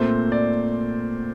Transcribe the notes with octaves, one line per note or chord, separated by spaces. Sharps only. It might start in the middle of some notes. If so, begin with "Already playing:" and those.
Already playing: A#2 A3 C4 C5
D5